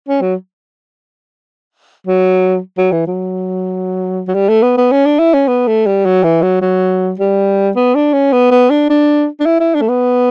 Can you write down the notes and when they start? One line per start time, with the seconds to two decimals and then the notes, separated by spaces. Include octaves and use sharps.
0.08 C#4
0.22 F#3
2.07 F#3
2.78 F#3
2.92 E3
3.07 F#3
4.28 F#3
4.34 G3
4.49 A3
4.63 B3
4.77 B3
4.91 C#4
5.06 D4
5.19 E4
5.34 C#4
5.48 B3
5.67 A3
5.86 G3
6.05 F#3
6.24 E3
6.42 F#3
6.61 F#3
7.19 G3
7.76 B3
7.95 D4
8.13 C#4
8.33 B3
8.51 B3
8.70 D4
8.90 D4
9.40 D4
9.46 E4
9.60 E4
9.75 D4
9.81 A3
9.89 B3